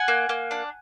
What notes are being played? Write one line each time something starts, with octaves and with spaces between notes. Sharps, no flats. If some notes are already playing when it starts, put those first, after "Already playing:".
Already playing: F#5 G#5
A#3
A#3
D4